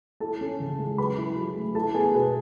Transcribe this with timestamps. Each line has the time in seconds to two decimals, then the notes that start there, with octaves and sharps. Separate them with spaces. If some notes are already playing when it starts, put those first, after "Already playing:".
0.20 E4 A4 A5
0.41 C#4
0.60 C#3
0.79 G#3
0.98 F#3 B4 B5
1.17 E4
1.36 F#3
1.56 A3
1.75 E4 A4 A5
1.94 B3 G#4 G#5
2.14 B2 B4